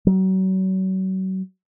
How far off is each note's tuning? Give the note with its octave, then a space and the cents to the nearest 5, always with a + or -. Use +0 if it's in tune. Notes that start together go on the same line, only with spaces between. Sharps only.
F#3 +35